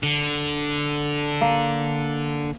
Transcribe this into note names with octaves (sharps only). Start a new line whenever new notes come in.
D3
A#3